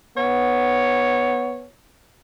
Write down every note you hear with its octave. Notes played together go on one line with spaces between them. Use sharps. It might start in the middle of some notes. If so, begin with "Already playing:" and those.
B3 C#5